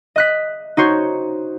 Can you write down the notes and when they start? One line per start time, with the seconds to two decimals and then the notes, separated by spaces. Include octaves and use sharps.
0.16 D#5 F#6 B6
0.77 D#4 F#4 C5 C#5